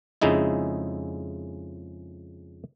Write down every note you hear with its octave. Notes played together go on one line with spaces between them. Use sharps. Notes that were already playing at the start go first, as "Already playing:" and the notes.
F2 C#3 G#3 D#4 E4